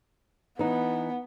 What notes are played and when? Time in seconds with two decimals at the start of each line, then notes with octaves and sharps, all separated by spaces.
0.59 E3 B3 D#4